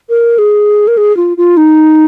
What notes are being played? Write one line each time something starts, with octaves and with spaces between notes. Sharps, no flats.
A#4
G#4
A#4
G#4
F4
F4
D#4